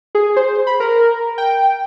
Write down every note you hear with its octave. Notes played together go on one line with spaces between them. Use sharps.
G#4
C5
B5
A#4
G5